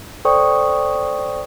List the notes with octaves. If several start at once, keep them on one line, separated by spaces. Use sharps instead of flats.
A4 C5 D5 G5 C#6 D#6